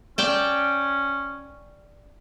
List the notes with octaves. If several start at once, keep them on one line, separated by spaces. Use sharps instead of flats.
C#4 D5 G5 A5